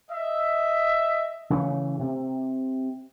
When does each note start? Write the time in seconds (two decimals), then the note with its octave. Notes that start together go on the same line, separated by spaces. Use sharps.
0.11 D#5 E5
1.50 C#3 E3 A3
1.99 C3